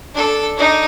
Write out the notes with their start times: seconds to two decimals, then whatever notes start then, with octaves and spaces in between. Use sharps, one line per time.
0.14 D4 A4
0.57 D4 D#4